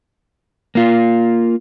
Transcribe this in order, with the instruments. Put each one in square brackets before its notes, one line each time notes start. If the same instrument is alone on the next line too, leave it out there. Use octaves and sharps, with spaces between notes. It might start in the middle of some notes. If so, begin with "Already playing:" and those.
[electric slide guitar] A#3 F4